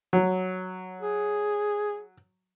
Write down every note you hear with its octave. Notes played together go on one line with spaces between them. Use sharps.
F#3
G#4